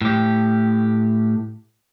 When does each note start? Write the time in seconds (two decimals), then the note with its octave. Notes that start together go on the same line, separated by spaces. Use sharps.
0.01 A2 G4